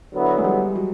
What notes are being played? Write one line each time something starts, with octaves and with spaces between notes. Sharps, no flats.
D3 F#3 B3 E4
G#3
G3
F#3